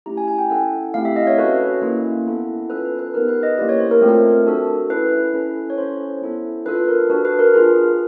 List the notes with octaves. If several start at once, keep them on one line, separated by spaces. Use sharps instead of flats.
A3 C#4 E4 G4 A#5
G#5
G#5
G5
C#4 E4 A4 F#5
A3 C4 E4 G4 F5
E5
D#5
C#5
C#4 F#4 A4 B4
A#3 C#4 E4
B3 E4 A4
C#4 F4 A4 B4
B4
B4
B3 D#4 G4 A#4
B4
D#5
A#3 C#4 E4 G4 D5
C#5
C5
A#4
A3 C4 F4 A4
A#4
D4 F#4 A4
C#4 E4 A4 B4
C#4 E4 A4
C#5
C#4 E4 A4 C5
B3 E4 A4
D4 F4 A4 B4
A#4
D4 F#4 A4 B4
B4
A#4
D4 F4 G#4 A#4